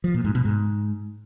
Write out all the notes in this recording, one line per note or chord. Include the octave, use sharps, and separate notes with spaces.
F3
A#2
G#2
B2
G#2